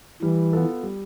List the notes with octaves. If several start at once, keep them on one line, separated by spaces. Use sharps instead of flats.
E3 G3
B3 F4 A4
G3